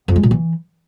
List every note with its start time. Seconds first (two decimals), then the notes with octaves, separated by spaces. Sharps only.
0.08 F2
0.16 G#3
0.23 A#2
0.31 E3